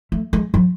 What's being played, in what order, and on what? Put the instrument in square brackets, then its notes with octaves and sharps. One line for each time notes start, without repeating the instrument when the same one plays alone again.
[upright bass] A3
G#3
F#3